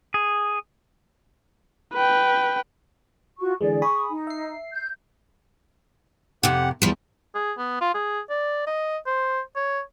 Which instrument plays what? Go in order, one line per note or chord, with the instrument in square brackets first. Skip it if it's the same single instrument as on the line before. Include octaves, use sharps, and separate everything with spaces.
[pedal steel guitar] G#4
[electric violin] B4 G5
[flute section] F4 F#4 C#6
[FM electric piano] D3 E3 G#3 [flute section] G#4 D5
[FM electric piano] G#4 B5 D#6 [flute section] C#6
[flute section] D#4
[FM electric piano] E5 C7
[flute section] G6
[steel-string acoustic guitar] F2 C3 [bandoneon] G4 F#5
[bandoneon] E2 [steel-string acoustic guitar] F3 G3
[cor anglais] G#4
B3
F4
G#4
D5
D#5
C5
C#5